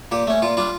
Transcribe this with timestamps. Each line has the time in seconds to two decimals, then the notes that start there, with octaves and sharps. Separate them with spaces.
0.12 A#2 G4
0.27 A3 C#4
0.42 A#2 F4
0.57 G3 D4 F4